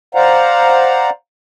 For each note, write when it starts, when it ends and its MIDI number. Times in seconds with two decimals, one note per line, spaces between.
0.15 1.10 72
0.15 1.10 74
0.15 1.10 77
0.15 1.10 78
0.15 1.10 82